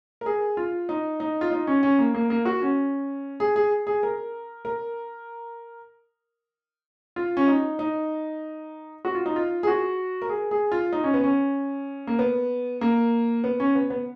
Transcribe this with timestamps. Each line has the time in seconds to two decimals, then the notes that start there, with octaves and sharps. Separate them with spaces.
0.21 A#4
0.26 G#4
0.57 F4
0.89 D#4
1.20 D#4
1.41 F4
1.51 D#4
1.67 C#4
1.83 C#4
1.99 A#3
2.14 A#3
2.30 A#3
2.45 F#4
2.62 C#4
3.40 G#4
3.56 G#4
3.87 G#4
4.03 A#4
4.65 A#4
7.16 F4
7.37 C#4
7.48 D#4
7.79 D#4
9.05 F#4
9.15 F4
9.26 D#4
9.36 F4
9.63 G#4
9.67 F#4
10.22 A#4
10.29 G#4
10.51 G#4
10.72 F4
10.93 D#4
11.04 C#4
11.14 B3
11.24 C#4
12.07 A#3
12.19 B3
12.81 A#3
13.44 B3
13.60 C#4
13.75 B3
13.90 B3